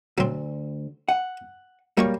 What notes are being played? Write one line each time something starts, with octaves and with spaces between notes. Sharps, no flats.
D2 F#3 C4
F#5
F#3 G3 A#3 C#5 C#6